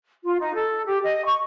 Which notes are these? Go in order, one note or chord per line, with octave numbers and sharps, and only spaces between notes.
F4
D#4
A4
G4
D#5
C#6